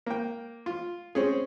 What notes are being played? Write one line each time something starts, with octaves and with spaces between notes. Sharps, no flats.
A#3 G5
F4
C4 C#4 G#4